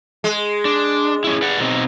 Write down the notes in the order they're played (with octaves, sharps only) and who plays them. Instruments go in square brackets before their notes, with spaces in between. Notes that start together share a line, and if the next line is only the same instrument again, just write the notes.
[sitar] G#3
[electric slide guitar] D4
C#4 E4
B4 D5 F#5
B2 C4 D#4